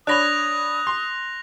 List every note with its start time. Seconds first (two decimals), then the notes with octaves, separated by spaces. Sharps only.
0.07 D4 C#5 B5 D#6 F#6 A#6 F7
0.87 C6